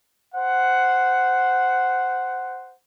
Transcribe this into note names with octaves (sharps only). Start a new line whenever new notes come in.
C5 F#5